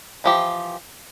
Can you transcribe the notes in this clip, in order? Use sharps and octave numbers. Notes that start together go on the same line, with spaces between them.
E3 F3 G4